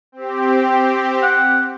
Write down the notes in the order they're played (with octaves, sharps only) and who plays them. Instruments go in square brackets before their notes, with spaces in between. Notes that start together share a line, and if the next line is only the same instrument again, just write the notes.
[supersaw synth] C4 G4
[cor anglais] F#5